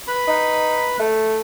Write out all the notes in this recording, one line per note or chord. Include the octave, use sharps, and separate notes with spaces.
B4 B5
D#4
A3